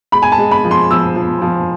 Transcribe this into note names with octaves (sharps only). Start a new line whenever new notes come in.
G#3 B5
G#5
A5
G#3
B5
F3
C6
F3 E6
F3
F3